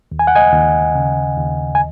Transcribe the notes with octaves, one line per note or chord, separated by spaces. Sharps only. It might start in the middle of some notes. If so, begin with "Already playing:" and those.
D#2
G#5
F#5
D#5 G#5
D#2
C#3
D#2
G#5